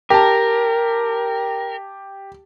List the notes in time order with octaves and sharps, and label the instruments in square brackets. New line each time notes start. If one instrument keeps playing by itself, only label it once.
[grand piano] G4 A5 [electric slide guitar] A#4